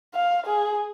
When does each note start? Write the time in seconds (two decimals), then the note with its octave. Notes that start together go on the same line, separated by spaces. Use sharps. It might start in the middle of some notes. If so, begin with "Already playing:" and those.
0.15 F5
0.46 G#4